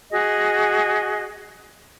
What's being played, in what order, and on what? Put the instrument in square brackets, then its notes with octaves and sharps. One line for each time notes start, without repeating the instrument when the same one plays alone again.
[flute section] F#4 G#4 D#5